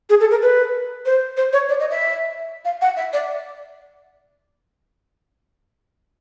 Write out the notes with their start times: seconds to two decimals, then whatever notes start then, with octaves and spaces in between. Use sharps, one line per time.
0.10 G#4
0.20 A4
0.31 A#4
0.42 B4
1.06 C5
1.37 C5
1.53 C#5
1.69 D5
1.80 D#5
1.91 E5
2.65 F5
2.82 F#5
2.97 E5
3.13 D5